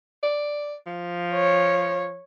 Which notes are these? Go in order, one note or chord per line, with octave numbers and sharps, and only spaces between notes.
D5
F3
C#5